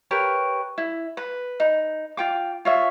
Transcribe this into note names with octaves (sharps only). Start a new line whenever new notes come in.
G4 A#4 B4 C#5
E4
B4
D#4
F4 G5 D6
F4 C#5 E5